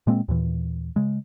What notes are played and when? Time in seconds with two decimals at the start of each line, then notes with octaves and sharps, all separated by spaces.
0.07 A#2 G#3 A#3 C4
0.28 D#2 A#2 E3
0.96 C#3 G#3